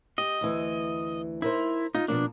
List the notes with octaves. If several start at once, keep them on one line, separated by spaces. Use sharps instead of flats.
G4 D#5
D2 E3
D#4 E4 A#4 C5
D#4 F4
B2 F3 A#3 D4